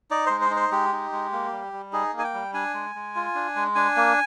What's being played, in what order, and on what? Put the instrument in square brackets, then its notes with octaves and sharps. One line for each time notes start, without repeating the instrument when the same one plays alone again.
[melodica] D#4 D5
G#3 C5
C5
D#4
C5
G#3 G4
D#4
G#3
A#3
G3
G3
D#4 G#4
A#3
G#5
G5
G3
D4 G#5
G#3
G#3
F4
D4
G#3
D4 G#5
A#3